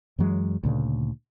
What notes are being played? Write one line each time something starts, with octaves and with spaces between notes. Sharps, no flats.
F#2 E3 F#3 G#3
D2 A#2 C#3